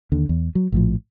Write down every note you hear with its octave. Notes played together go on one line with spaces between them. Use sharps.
D#2 D3
E2
F#3
A#1 A2 F3